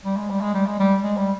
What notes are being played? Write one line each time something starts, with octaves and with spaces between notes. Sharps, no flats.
G3
G#3
G3
G#3
G3
G#3
G3
G#3
G3